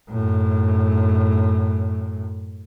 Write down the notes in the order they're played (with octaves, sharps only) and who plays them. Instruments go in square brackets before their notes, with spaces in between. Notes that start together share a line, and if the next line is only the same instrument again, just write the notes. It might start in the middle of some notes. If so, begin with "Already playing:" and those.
[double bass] F#2 A2